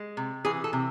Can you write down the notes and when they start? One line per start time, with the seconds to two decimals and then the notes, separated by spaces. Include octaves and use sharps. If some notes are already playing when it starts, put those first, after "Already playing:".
Already playing: G#3
0.17 C3
0.45 E3 G#4
0.64 A4
0.73 C3